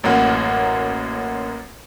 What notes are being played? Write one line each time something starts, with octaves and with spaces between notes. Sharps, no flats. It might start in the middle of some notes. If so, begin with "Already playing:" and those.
A1 F#2 A#3 F#5